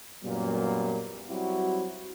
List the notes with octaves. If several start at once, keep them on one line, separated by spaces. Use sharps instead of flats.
F#2 A#2 F#3 G3 A#3 B3
F#3 G3 C4 E4 F#4